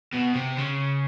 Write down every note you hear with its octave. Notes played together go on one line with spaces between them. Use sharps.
B2
C3
C#3